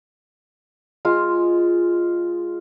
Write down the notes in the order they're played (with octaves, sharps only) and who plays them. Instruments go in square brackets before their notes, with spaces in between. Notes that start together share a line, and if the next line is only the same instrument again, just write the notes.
[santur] G#3 F4